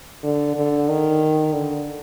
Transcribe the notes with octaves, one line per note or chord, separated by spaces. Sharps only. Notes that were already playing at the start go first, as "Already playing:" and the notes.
D3
D3
D#3
D3